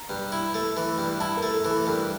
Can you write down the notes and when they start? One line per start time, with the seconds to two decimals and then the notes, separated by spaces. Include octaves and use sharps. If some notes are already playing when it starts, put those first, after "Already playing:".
Already playing: A#5
0.09 G2
0.32 E4
0.54 A3
0.77 E3
0.98 G2
1.20 E4 A5
1.37 A#4
1.43 A3
1.54 A4
1.65 E3
1.70 A4
1.87 G2 A#4